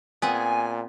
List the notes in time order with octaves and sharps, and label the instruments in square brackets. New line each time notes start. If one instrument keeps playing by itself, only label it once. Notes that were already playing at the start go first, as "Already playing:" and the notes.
[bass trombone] A#2 [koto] B3 C4 G#4 [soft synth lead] G#5